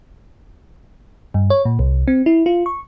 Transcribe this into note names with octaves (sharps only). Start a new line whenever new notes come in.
G2
C#5
A#2
C2
C4
E4
F4
C#6